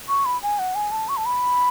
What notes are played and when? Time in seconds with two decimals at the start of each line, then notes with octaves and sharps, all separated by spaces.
0.09 C#6
0.26 B5
0.43 G#5
0.59 F#5
0.75 G#5
0.92 A5
1.09 C#6
1.17 A5
1.26 B5